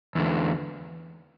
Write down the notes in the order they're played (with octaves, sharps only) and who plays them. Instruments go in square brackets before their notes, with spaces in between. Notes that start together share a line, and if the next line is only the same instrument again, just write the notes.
[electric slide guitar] E2 D3